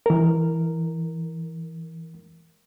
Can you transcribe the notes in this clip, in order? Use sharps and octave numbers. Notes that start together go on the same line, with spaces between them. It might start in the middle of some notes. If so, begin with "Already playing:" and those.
E3 A#4